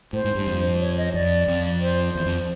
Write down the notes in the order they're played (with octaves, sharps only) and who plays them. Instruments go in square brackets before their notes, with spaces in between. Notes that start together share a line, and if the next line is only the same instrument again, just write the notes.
[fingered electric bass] A2 [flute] C5
[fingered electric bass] G#2
G2
F2
[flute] C#5
D#5
[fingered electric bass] F2 [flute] D5
[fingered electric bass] F2
[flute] C5
[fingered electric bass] E2
F2